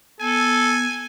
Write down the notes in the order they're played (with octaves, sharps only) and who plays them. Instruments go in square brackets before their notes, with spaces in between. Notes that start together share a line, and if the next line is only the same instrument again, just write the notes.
[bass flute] B3 [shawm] A4 [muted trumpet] G#5